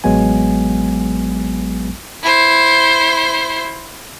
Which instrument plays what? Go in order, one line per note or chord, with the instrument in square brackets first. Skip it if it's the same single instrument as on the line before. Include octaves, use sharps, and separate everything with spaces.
[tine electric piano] A1 F#3 G#3 B3 G#5
[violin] E4 C5